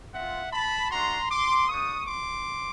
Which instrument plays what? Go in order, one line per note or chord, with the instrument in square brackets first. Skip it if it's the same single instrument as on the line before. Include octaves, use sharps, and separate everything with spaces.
[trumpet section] C4 F4 E5 F#5
A5 B5
A3 D4 F#4 A#5 C6
C6 D6
A#3 D4 G4 C#6 D#6
C6 D6